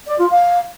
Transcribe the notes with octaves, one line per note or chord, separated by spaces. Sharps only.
D5
F4
F5